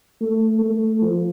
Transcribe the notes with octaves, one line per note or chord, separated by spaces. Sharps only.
A3
A3
F3